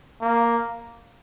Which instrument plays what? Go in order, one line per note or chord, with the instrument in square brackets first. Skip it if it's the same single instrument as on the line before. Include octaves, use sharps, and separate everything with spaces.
[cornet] A#3